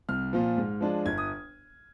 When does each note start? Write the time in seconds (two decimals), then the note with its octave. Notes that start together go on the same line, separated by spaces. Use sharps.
0.09 C2 F6
0.33 A#2 F3
0.58 G#2
0.81 F3 G#3 D4
1.06 G1 G#6
1.18 D#6